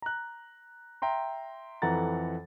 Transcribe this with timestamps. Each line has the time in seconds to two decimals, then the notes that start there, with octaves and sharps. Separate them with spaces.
0.02 A#5 F#6
1.02 E5 G5 A#5 C6
1.82 F2 E3 A4 F#5 A#5 A6